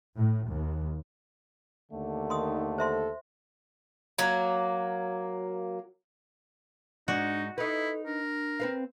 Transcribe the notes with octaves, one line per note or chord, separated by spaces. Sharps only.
A2
D#2
D#2 D3 A3
D#3 C6 D#6
A4 C5 E5 C6
F#3 A#3
G#2 G#3 D4 D#4 F#4 D5
D#4 E4 A4 B4
D4 A#4
C4 B4 F5